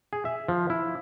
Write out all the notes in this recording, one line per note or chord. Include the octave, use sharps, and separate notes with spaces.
G#4
E5
F3
E4